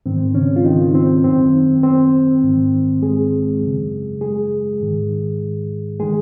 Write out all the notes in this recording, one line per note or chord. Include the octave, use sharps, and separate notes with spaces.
G#2 D#3 C4
C#3 C#4
F4
D#3 D#4
C4
F#2 D#3 C4
C4
G#2 D#3
G#3 G#4
F#2 C#3
G#3 G#4
G#2 D#3
D#3 G#3 G#4